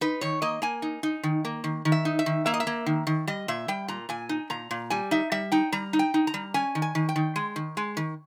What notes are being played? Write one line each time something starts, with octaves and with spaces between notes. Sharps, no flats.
D#4 B4
D#3 C#5
A#3 D#5
A#3 G#5
D#4
D#4
D#3
A#3
D#3
D#3
E5
D#4
E5
D#3
A#3 E5
D#5
E5
A#3
D#3
D#3
G3 D#5
A#2 E5
G3 G5
A#2 A#5
A#2 G#5
D#4
A#2 A#5
A#2
G3 G#5
D#4 E5
G3 E5
D#4 G5
G3 A#5
D#4
G5
D#4
A#5
G3
C#4 G#5
D#3
G#5
D#3
G5
D#3
G#3
D#3
G#3
D#3